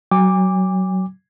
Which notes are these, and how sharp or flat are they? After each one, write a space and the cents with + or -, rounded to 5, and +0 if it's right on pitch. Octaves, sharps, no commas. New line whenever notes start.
F#3 +20 G#5 -45 D6 +0